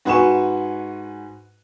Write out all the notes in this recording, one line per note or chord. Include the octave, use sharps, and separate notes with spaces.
G#2 F#4 B4 G#5 C#6 E7